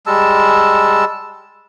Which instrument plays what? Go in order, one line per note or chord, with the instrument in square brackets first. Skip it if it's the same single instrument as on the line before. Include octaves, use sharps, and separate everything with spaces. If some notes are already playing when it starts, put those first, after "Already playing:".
[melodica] G3 G#3 A5 E6